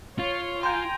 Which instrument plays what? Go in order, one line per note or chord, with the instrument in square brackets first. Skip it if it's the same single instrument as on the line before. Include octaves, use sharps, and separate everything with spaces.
[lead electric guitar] F4 [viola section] C#5
[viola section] G5 G#5 A#5 [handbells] C6 G6